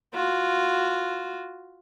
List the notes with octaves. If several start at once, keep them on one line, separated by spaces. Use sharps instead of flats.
F4 F#4